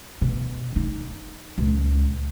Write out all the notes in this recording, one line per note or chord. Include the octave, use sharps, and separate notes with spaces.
B2
D#4
C#2 A#2